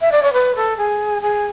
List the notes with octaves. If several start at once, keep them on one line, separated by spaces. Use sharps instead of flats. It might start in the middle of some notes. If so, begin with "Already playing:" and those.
E5
D5
C#5
B4
A4
G#4
G#4